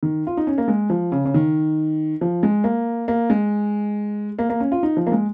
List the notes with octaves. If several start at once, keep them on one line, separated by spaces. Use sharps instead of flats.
D#3
F4
D#4
C#4
A#3
G#3
F3
C#3
C#3
D#3
F3
G#3
A#3
A#3
G#3
A#3
A#3
C#4
F4
D#4
F3
A#3
G#3